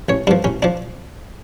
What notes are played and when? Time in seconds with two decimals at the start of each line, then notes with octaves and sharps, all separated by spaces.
0.09 A1 C#5
0.27 G2 F3 D4
0.44 A1 C#4
0.62 F3 D4